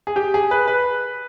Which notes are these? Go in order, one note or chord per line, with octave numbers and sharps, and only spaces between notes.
G#4
G4
G#4
B4
B4